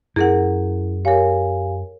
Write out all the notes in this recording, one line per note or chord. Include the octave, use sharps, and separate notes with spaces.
F#2 E4 G#4 A#4 F#5
G4 A#4 C#5 F5 G#5